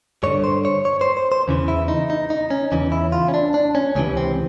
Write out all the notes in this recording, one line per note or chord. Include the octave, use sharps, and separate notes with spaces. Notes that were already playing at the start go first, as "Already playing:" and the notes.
G2 D3 C#5
C5
C#5
C#5
C5
C5
C5
E2 C#3 E3
E4
D#4
D#4
D#4
C#4
E2 C#3 E3 C#4
E4
F4
C#4
D4
D4
C#4
C#2 C3 E3 C#4
C4